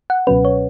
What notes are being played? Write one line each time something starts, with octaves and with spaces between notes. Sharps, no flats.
F#5
C#2 B2 F#3 C#4 B4
C#5